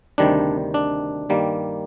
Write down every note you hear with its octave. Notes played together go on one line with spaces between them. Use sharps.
D2 C3 D#3 G3 D4
D4
G2 D#3 G3 A#3